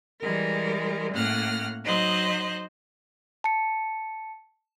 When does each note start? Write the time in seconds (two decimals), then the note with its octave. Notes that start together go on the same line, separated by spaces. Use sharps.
0.23 E3 G3 G#3 A#4
1.14 A2 A#3 C#4 F#5 F6 A#6
1.84 F#3 D#4 C5 D#5 F#6
3.44 A5 C#7